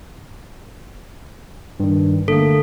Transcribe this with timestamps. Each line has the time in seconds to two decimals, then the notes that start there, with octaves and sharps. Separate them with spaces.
1.80 G2 D#3
2.28 D3 A3 A#3 A4